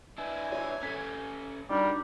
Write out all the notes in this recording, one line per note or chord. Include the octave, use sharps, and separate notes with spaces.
D4 E4 B4 G#5
C#5
C#4 A4 C#5 B6
G3 D4 D#4 F#4 A#4